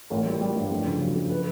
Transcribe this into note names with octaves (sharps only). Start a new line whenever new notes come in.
A1 A#4
G3
G3
G2
F2
C#3
F#3
F2
B4